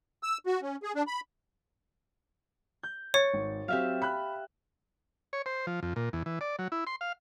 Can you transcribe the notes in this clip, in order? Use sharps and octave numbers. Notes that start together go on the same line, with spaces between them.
E6
F#4
C#4
G#4
D4
B5
G6
C#5 C#6 A6
G#1
F#3 C4 G4 E5 F5
B5 F#6
C#5
C5
F3
F2
A#2
E2
E3
D5
F#3
E4
C6
F5